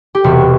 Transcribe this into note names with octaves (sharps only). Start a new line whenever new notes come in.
G4
E1 E2 C3 F#4